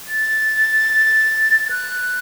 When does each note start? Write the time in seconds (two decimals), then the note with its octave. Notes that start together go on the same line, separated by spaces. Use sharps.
0.08 A6
1.65 A6
1.70 F#6